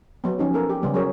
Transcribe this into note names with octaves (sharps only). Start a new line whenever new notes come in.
F#3 B3
F3 C#4 D#4 G4
B3 A4 A#4
G4
C#3 G3 B3
F#3 G#4 A#4 C#5